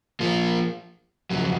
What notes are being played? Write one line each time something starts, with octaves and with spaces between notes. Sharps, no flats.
F3 A#3 F4
F2 C#3 F#3